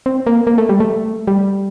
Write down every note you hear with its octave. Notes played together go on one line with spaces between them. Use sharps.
C4
A#3
A#3
A3
G3
A3
G3